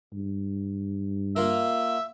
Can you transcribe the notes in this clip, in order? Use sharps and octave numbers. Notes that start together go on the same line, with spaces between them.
G2
A#3 F4 A#4 E5